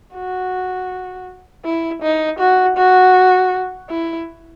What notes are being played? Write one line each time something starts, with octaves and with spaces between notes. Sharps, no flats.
F#4
E4
D#4
F#4
F#4
E4